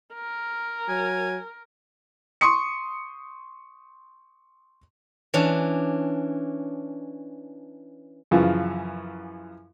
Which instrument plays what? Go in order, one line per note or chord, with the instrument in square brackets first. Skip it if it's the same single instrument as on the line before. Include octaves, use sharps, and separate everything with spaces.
[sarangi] A#4
[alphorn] F#3 [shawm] G#5
[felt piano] C6 C#6 D#6 C#7
[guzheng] E3 C#4 D4
[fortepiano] F#2 C#3 E3 F3